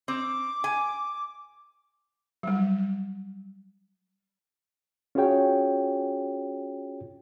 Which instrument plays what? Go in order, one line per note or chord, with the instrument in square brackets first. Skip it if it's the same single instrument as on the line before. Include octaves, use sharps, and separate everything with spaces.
[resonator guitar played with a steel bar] C4 [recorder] D6
[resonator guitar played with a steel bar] G#5
[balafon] F#3 G3
[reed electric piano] C#4 F4 F#4 G#4 C#5 G5